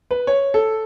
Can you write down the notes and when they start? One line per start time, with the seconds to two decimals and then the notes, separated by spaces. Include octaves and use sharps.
0.11 B4
0.27 C#5
0.54 A4